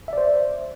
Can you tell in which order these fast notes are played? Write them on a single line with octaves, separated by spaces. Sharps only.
E5 D5 C5